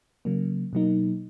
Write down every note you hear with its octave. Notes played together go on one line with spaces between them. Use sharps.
C#3 F#3 A#3
B2 F#3 A#3 D#4